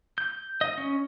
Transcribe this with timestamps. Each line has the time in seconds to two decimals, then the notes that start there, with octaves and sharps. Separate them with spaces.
0.18 G6
0.61 D#5
0.78 C#4